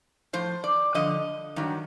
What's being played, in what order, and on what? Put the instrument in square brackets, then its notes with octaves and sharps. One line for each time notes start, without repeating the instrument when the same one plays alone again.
[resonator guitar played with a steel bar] A2 F3 C5
D5
G2 D3 F3 D#5
G2 D#3 F#3